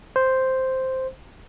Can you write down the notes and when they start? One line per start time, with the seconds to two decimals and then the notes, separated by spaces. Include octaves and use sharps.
0.16 C5